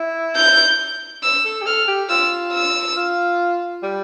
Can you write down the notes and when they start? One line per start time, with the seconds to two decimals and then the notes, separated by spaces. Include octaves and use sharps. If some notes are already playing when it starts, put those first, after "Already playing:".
Already playing: E4
0.36 G6
1.23 E6
1.45 A4
1.62 G4
1.66 A4 F6
1.87 G4
2.10 F4 E6
2.53 E6
2.97 F4
3.83 G3